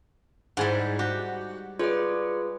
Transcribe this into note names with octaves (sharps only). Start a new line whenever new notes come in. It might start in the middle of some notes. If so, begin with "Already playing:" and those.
G#2 G3 E4 G#4 F#5
F#4 G4
F4 G#4 B4 C#5 D5